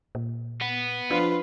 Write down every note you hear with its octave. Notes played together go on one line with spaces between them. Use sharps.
A#2
B3
F3 D4 F4 B4